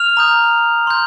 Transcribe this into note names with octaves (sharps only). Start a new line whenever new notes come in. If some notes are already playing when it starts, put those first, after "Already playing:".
Already playing: F6 F7
A#5 D#6 G6
C6 G6